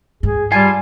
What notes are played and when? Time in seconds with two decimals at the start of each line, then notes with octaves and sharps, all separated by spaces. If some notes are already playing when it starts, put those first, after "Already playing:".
0.23 G#2 G#4
0.52 G3 F4 G#5 A5